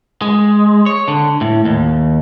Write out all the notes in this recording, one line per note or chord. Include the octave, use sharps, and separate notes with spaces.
G#3
C#5
D3
A2
D#2